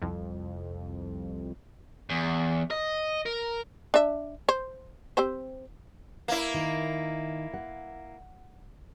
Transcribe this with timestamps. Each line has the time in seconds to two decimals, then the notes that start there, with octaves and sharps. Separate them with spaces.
0.02 C2 F2
2.09 E2
2.71 D#5
3.26 A#4
3.94 D4 E5
4.49 C5
5.17 C4 G4 C5
6.28 A#3 E4
6.54 D#3
7.54 F#5